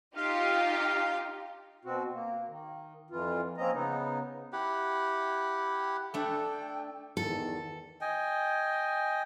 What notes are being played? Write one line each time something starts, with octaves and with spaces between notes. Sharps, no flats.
D#4 F4 G4 F5
B2 C4 F#4
A#3
D#3
F2 E3 F4
F3 A#3 C4 C#4 D#5 A#5
C#3 B3 D#4
E4 G4 F#5
A3 D4 A4 G5
E2 D#3 A4
D#5 G5 G#5